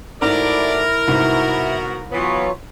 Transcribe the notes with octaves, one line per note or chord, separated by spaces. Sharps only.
G#2 F#3 A3 E4 A#4 D5
C2 G#2 B2 F#4
E3 F#3 B3 F4 C#5